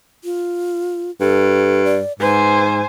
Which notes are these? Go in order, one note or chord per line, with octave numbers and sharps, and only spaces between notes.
F4
G2 A4
D5
G#2 B4 C5 G#5